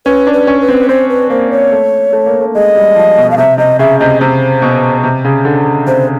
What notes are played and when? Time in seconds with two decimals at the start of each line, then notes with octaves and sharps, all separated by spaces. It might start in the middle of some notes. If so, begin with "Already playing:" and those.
0.05 C#4 B4
0.27 D4
0.33 B4
0.47 C#4
0.61 B4
0.69 C4
0.89 C4 C5
1.09 B4
1.30 A#3 C5
1.51 C#5
1.72 A3
2.13 A3
2.26 A#3
2.41 A3
2.55 G#3 D#5
2.76 G3
2.96 F3
3.18 B2
3.31 F5
3.38 C3 E5
3.58 C3 D#5
3.79 C#3 E5
4.00 C3 D#5
4.21 C3 C5
4.62 B2
5.04 C3
5.25 C#3
5.45 D3
5.87 C3 C5